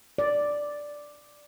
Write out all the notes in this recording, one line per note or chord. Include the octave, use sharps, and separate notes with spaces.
D5